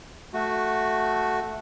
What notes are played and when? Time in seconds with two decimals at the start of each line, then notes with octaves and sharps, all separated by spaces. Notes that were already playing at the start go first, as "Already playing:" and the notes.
0.34 A3 F#4